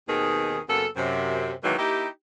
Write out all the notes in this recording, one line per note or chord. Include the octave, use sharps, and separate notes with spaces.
D#2 B2 D#3 C4 G#4
F#2 C#3 A#3 B3 A4
F#2 C3
B2 D#3 E3 F#3 G#3 A#3
A#3 D#4 E4 G4